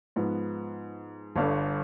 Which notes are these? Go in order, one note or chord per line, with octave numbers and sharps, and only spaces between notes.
G#2 F3 B3
G1 G2 D3